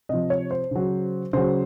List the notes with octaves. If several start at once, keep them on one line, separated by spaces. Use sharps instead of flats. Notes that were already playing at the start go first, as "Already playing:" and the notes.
C3 F3 D#5
C#5
C5
C#3 F#3
C#3 F#3 C5